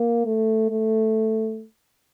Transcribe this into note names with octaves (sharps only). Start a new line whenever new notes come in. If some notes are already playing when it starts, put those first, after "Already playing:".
Already playing: A#3
A3
A3